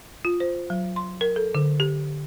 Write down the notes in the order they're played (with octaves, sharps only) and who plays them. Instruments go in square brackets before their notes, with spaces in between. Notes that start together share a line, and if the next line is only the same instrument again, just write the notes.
[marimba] F4
C5
F#3
C6
A#4
A4
D3
G4